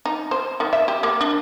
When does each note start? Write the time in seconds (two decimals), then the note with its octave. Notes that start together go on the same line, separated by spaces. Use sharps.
0.06 D#4
0.31 C5
0.60 D#3
0.73 E5
0.88 G4
1.03 A#3
1.21 D4